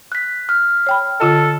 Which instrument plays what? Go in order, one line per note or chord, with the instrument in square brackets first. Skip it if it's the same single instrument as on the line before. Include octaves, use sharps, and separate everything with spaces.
[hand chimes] F#6 B6
F6
[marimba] C#5 G5 B5
[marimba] D3 F4 D#5 [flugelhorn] A4